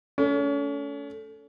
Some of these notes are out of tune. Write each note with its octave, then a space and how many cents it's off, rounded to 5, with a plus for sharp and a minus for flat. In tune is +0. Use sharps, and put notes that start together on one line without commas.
A3 +0 C#4 +35